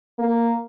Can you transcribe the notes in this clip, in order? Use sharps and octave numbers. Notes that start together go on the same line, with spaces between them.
A#3